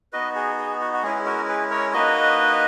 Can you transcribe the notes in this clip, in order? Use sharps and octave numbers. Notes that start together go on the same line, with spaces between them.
B3 D#4 F#4 B4 D#5
G#4
G#4
F#4
F#4
G#3 C#4 E4 G#4
F#4 A#4
G#4 B4
A#4 C#5
A#3 D#4 F#4 B4 D#5